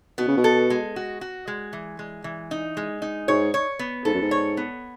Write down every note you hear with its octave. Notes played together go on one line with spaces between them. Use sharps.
B2 B3
C#3
B2
A4
G#3
F#4
F#4
G#3
E3
G#3
E3
D#4
G#3
D#4
G#2 C#5
C#5
B3
G#2 A4
F#2
G#2
C#5
B3